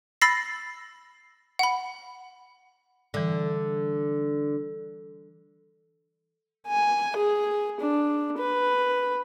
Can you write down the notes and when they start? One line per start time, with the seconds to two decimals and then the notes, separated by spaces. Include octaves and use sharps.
0.22 B5 E6 A6 A#6 C7
1.59 F#5 B5
3.14 D3 E3 G3
6.68 G#5
7.16 G#4
7.81 D4
8.38 B4